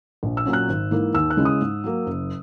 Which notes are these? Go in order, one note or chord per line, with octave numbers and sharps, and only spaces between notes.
A#1
E6
A#2 F#3 C#4
F#6
G#1
G#2 E3 A#3
D#2 E6
F#6
C#3 G#3 C#4 E4
D#6
G#2
F#3 A#3
F#1